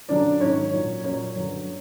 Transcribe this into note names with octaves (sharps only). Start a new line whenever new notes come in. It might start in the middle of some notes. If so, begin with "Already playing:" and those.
F#2 D3 F#3 D4 D5
G#2 D#3 F#3 C#4 C#5
A#2 F#3
A#2 F#3 C#4 C#5
G2 D3 F#3